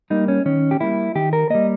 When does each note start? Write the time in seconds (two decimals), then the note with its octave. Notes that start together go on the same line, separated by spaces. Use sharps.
0.10 G3 A#3 D#4
0.28 C#4
0.46 D#3 C#4
0.71 G4
0.81 G3 A#3 E4
1.15 D#3 G4
1.33 A#4
1.50 G3 A#3 D#5